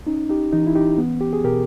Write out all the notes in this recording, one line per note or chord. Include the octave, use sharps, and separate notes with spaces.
C#4 D#4
D#4 G4
E3 D#4
E4
D#4 G4
B3
G4
G#4
B2 G4 A#4